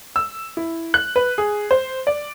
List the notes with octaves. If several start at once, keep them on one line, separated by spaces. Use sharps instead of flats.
E6
E4
F#6
B4
G#4
C5
D5